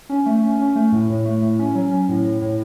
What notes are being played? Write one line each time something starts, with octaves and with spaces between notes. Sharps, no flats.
C#4
A3
C#4
C#4
A3
A2
A2
A3
A2
C#4
F#3
C#4
A2
A2
A2